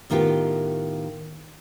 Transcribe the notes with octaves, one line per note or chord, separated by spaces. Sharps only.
A2 D#3 B3 F4 G4